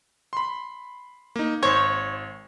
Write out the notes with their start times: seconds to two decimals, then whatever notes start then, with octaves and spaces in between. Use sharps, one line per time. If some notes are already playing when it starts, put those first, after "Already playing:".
0.33 B5 C6
1.36 A#3 D#4
1.63 G#1 C5 C#5 C#6